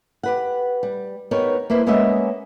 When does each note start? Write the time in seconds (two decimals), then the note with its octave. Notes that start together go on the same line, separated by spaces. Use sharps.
0.23 G4 B4 F#5
0.83 G3
1.31 B3 D#4 G4 A#4 C#5
1.70 A#3 E4 B4 C5
1.87 G#3 A#3 B3 C#4 D#5 E5